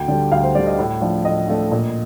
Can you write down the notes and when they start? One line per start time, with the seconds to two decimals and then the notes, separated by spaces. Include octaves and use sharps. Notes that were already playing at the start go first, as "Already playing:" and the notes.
Already playing: D2 G5
0.08 D3 G3
0.32 D2 F5
0.43 C5
0.55 D3 G3 D5
0.67 D#5
0.79 A2
1.02 F3 A3 D4
1.25 A2 D#5
1.48 F3 A3 D4
1.72 A#2